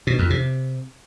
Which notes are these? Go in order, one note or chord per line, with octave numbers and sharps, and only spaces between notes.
B2
F2
C3